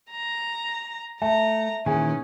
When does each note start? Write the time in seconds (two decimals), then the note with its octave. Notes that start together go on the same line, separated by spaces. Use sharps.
0.11 A#5
1.22 A3 E5 A5 A#5
1.86 A#2 D#3 E3 C#4 G#4